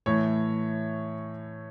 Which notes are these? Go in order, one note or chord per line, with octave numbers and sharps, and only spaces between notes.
A2 E3 C#5